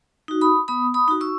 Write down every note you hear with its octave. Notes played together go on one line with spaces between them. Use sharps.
D#4 F#4
B5 D#6
B3 B5 D#6
B5 D#6
D#4 F#4
C#6 E6